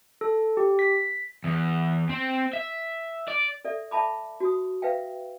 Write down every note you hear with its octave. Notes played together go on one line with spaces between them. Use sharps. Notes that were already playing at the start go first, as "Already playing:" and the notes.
A4
G4
B6
E2
C4
E5
D5
A4 D5 E5
E5 A5 B5 D6
F#4 D#6
B4 E5 F5 G5